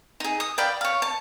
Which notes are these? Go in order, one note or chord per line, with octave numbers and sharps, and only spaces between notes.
D#4 G#4
D#6
D5 F5 G5 B5
C#5 F5
A5